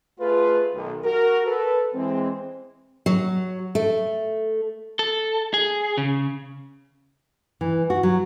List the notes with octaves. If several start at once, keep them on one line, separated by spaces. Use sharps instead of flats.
A3 F4 G#4 B4
B1 D#3
F#4 A#4
A4 B4
E3 G#3 C4
F#3
A3
A4
G#4
C#3
E3
F#4
F#3